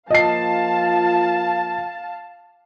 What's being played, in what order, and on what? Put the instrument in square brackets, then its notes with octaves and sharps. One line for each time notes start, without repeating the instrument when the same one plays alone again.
[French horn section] F3 A#3 F4 [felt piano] D#5 C7 [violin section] F5 A5